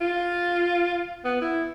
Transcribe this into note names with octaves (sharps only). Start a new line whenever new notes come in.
F4
B3
E4